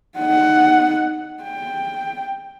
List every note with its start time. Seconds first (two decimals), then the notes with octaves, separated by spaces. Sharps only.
0.18 D#4 F#5
1.44 G5